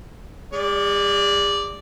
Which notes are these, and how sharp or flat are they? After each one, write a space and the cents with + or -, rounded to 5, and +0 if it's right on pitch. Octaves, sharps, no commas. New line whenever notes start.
G#3 -45 D5 -5